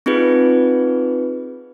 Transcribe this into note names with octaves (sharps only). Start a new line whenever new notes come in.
C4 D#4 F4 G#4 B4